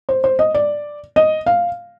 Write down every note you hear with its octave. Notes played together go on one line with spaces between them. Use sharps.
C5
C5
D#5
D5
D#5
F5